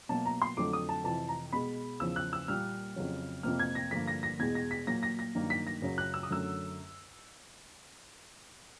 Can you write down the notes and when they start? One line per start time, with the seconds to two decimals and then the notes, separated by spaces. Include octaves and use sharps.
0.09 B2 F#3 A#3 A5
0.26 A#5
0.42 C6
0.57 F2 D3 F#3 A3 D6
0.73 D#6
0.89 A5
1.04 F2 C3 E3 A5
1.28 A#5
1.53 B2 G#3 B5
2.00 E2 C#3 F3 E6
2.16 F#6
2.33 E6
2.48 A#2 G3 A#3 F6
2.96 F2 C#3 F#3
3.43 F2 C3 F3 A#3 F6
3.60 G#6
3.75 A#6
3.91 G2 D3 F3 A#3 B6
4.08 A#6
4.23 A#6
4.39 E2 B2 G#3 G#6
4.55 A#6
4.71 B6
4.87 A#2 F#3 A#3 A#6
5.03 A#6
5.19 A#6
5.35 G2 D#3 F#3 A#3
5.50 B6
5.67 A#6
5.82 F#2 C#3 F#3
5.98 F#6
6.14 E6
6.23 D#6
6.30 F#2 D3 F#3 A3 E6